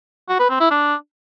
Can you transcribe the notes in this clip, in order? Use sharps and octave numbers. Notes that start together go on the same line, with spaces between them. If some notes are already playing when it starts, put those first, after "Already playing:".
F#4
B4
C4
E4
D4